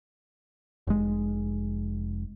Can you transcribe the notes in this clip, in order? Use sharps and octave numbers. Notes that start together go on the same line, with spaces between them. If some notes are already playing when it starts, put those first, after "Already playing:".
F1 G#3